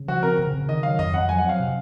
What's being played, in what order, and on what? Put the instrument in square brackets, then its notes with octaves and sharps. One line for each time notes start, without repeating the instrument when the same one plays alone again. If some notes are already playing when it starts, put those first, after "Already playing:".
Already playing: [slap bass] C#3
[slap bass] F3 [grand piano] F#4
[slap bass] C4 [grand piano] A#4
[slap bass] C#3
C#3
[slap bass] D#3 [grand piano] D#5
[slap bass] F#3 [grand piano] F5
[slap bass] F2 [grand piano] D#5
[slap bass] F2 [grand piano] F#5
[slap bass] F#3 [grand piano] G#5
[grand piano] F#5
[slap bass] C4
[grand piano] F5
[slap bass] C3